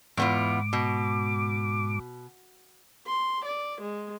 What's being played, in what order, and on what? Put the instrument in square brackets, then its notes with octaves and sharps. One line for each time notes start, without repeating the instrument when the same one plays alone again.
[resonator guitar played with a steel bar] E2 B3 F4 [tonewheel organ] G#2 D6
[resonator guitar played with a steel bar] B2
[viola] C6
D5
G#3